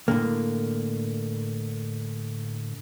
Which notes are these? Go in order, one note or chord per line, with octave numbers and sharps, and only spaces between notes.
A2 D3 A#3